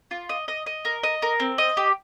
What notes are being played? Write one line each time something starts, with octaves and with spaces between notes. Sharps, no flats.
F4
D#5
D#5
D#5
A#4
D#5
A#4
C4
D#5
G4